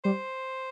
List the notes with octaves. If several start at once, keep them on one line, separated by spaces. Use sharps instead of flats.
G3 C5